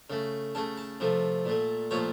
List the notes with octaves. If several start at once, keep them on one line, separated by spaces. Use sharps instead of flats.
C#3 A3
C#3 A3 A5
A5
C3 F3 A3
A#2 A3
A#2 F3 A3 C#5